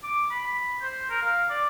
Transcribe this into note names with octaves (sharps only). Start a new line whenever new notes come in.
D6
B5
C5
A#4
F5
D5